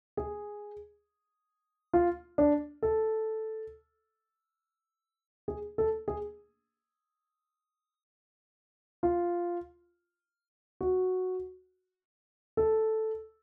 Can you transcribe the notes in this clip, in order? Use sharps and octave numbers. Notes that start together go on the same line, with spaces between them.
G#4
F4
D4
A4
G#4
A4
G#4
F4
F#4
A4